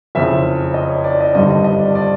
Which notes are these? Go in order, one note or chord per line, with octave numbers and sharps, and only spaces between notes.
F#1 F2 C#3 E5
D#5
C#5
D5
D#5
G#1 G2 D3 G3 D#5
D#5
D#5
D5
D5